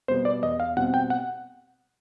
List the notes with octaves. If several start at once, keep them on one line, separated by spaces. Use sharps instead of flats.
B2 G3 B3 C5
D5
E2 D#5
F5
B2 G3 C4 F#5
G5
F#5